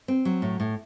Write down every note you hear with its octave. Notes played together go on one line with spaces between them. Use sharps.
C4
F#3
A2
A2